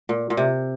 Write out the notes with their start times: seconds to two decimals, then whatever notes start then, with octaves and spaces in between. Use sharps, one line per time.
0.09 A#2
0.30 A#2
0.37 C3